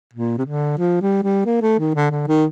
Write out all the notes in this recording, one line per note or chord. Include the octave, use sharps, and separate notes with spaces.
A#2
C3
D3
F3
G3
G3
A#3
A3
D#3
D3
D3
D#3